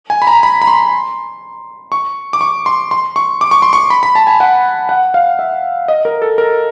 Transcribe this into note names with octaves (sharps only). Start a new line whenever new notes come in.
G#5
B5
A#5
B5
B5
C6
C#6
D6
C#6
C6
C6
C#6
D6
C#6
C6
C#6
B5
B5
A5
G#5
F#5
F#5
F5
E5
D#5
A#4
A4
A#4